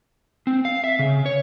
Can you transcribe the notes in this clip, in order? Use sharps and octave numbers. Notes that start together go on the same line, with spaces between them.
C4
F5
E5
C#3
C#5